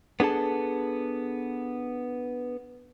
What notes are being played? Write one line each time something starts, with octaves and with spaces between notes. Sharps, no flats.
B3 D4 G#4 A4 A5